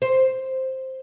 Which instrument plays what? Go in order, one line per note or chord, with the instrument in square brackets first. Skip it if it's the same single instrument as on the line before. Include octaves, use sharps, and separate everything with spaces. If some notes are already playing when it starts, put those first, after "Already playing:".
[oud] C5